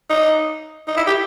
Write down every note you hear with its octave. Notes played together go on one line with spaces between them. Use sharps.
D#4
D#4
E4
G4